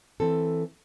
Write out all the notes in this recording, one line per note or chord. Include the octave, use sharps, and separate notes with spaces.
E3 C4 A4